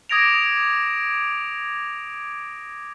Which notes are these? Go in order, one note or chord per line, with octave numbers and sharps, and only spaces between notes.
D6 D#6 G#6 A#6 D7 F7